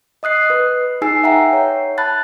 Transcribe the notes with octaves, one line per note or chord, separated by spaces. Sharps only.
D#5 D#6 F#6 C7
B4
D#4 G#4 G#5 E6 C7
E5 F#5 G5 A#5 C7
C#5
A5 B5 F#6 A6